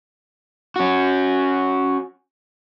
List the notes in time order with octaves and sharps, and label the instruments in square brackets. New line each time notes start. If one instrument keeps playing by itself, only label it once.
[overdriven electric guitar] C#4 F#4